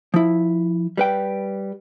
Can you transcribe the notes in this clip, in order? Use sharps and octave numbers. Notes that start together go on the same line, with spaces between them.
F3 E4
G3 B4 G5